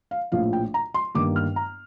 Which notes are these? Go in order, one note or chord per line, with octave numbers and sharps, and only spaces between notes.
F5
A#1 A2 F3 F5
G5
A#5
C6
G1 G2 D#3 A#3 D6
F6
A#5